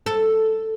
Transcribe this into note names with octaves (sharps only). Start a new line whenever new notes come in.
A4